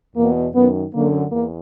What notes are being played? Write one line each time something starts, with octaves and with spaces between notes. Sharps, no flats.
E2 B2 A#3
F#2 D#3 B3
F#2 D3 A#3
E2 A#3